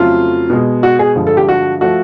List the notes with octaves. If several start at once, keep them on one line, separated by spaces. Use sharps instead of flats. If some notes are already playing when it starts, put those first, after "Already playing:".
Already playing: F2 C#3 F#3 A3 F4
B2 G#3
F#4
G#4
G2 D3 F3 G#3
A4
G4
F#4
F3 A3 F#4